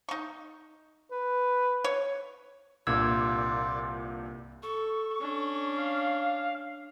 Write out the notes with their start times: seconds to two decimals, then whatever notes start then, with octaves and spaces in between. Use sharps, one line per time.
0.09 D#4 C#6
1.11 B4
1.84 C#5
2.87 C2 G2 A#2 F4 D5 D6 E6 G#6
4.63 A4 C#6
5.20 C#4 D4
5.78 F5